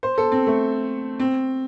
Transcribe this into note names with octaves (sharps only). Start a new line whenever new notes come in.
C5
A4
C4
A3
C4